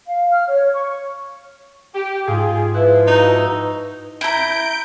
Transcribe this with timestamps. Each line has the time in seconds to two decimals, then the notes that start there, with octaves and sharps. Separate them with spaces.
0.07 F5
0.32 F6
0.48 C#5
0.74 C#6
1.95 G4
2.27 G#2 F4 G#4
2.74 F3 E4 F4 B4 F#6
3.07 D#4 F#4
4.21 E4 A#5 G6 D7